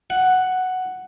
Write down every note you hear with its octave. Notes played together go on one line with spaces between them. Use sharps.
F#5